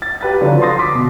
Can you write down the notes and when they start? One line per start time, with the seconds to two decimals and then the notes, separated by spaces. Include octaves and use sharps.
0.02 A6
0.21 G4 B4 A6
0.41 D3 F3 F#3
0.61 C6 D#6 A6 A#6
0.79 C6 D6 B6
0.95 B2